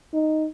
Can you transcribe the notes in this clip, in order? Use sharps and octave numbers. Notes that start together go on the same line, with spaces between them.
D#4